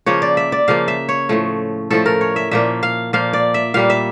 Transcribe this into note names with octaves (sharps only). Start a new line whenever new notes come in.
C#3 F3 A#3 C#5
D5
E5
D5
C#3 F3 A#3 F5
E5
C#5
A2 F3 A3
A2 F3 A3 A4
A#4
C#5
E5
A#2 F3 A#3 E5
F5
A#2 F3 A#3 F5
D5
E5
A#2 G3 A#3 F5
E5